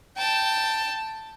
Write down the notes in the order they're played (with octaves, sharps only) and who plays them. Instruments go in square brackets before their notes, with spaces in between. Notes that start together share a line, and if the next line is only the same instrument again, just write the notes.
[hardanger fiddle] G5 A5